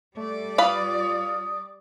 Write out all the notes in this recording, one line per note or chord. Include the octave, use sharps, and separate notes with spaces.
G3 A3 D5
F4 B4 F5 B5 D#6